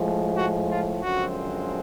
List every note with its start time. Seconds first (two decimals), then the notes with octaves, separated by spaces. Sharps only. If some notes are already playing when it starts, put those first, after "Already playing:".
Already playing: A2 F3 G#3
0.36 F#4
0.69 F4
1.03 F#2 D3 F3 G#3 C4 F#4